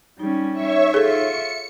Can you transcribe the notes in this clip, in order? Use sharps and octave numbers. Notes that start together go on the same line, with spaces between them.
G3 C#4 D#4
C#5 E5 C#6
F4 G#4 A4 E5 C#7